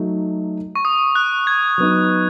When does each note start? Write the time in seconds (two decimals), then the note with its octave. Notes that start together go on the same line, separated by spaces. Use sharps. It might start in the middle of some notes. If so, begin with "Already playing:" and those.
Already playing: F#3 A3 D#4
0.76 C#6
0.85 D#6
1.15 F#6
1.47 G#6
1.78 F#3 B3 D#4